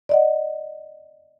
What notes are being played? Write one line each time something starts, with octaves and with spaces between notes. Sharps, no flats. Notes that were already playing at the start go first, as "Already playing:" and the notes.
D5 D#5 F#5